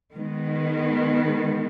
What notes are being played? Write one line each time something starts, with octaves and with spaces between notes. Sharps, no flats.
D#3 G#3 B3